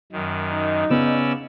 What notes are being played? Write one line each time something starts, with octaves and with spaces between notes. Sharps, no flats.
F#2 D#3
D#4
C#3 B3 C#4 D5 E6